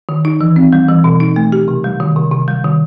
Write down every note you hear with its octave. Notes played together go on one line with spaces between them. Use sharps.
D#3
D#4
E3
C4
G3
E3
B2
D#4
A3
G4
C3
G3
D#3
C3
C3
G3
D#3